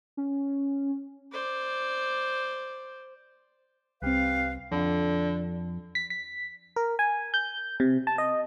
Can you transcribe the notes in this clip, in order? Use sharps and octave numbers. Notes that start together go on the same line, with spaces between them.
C#4
C5 D5
C2 C4 G4 B4 F5
F2 D3
B6
B6
A#4
G#5
G6
C3
A5
D#5